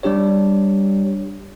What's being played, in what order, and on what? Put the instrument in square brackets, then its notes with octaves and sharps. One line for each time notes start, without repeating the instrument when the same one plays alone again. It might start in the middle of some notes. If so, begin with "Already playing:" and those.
[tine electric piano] G3 D4 G4 C#5